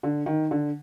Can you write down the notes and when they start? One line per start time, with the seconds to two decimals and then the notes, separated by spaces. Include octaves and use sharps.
0.03 D3
0.26 D#3
0.51 D3